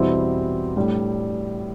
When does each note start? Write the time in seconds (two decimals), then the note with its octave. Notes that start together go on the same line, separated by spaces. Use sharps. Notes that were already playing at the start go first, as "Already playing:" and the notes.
Already playing: E2 B2 G3 C4 E4
0.77 A2 G3 D4